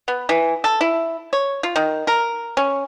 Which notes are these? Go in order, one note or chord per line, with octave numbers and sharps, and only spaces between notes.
B3
E3
A4
E4
C#5
F4
D#3
A#4
C#4